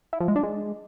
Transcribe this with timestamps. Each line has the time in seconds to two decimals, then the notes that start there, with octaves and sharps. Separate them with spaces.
0.13 E4
0.20 F3
0.28 G#3
0.36 D4
0.43 G#3